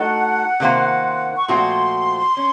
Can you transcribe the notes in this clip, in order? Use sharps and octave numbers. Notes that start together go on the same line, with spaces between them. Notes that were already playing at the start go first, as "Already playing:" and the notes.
Already playing: A3 D#4 F#4 A4 F#5
C3 D#3 A#3 F4 C5
C#6
A#2 F3 A3 C4 F#4 C6
C#4